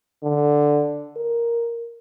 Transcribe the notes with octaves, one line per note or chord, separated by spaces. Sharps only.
D3
A#4